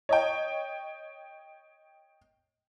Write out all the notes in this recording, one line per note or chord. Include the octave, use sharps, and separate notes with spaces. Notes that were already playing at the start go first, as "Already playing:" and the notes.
C#5 D#5 G5